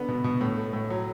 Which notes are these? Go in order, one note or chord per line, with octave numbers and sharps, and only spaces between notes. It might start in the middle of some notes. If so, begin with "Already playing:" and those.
Already playing: D3 B3
B2
B2
A2
A3
A2
F#3